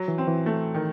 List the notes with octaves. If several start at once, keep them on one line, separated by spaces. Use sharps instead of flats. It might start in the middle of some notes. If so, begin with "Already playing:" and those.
Already playing: F#3
E3
C4
E3
A3
D#3